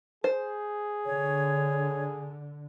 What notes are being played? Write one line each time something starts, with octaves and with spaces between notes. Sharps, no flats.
G#4 C5
D3 C#5